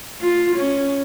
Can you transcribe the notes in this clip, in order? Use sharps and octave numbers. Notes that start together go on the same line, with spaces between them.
F4
C#4